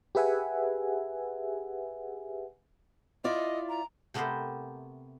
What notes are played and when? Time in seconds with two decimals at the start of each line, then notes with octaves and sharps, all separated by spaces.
0.15 G4 G#4 B4 E5 F#5 G#5
3.24 E4 F4 D5 D#5
3.69 A#5
4.14 C3 A3 B3 G4 A#4 C5